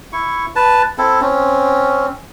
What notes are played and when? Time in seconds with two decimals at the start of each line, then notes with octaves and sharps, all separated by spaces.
0.13 E4 C#6
0.56 B4 A5
0.98 C4 E4 A4
1.21 C4 C#4